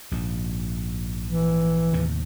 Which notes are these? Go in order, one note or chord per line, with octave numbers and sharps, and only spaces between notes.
A#1 G#2
E3
D#2 A2 C3